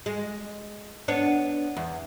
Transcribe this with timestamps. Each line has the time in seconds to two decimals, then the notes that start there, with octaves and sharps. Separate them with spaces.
0.06 G#3
1.08 B3 D4 C#5
1.77 E2